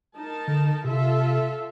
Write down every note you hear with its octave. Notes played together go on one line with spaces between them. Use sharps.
D#4 A#4 A5
D3
C3 F4 A4 E5